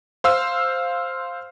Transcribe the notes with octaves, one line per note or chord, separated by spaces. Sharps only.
C5 F5 E6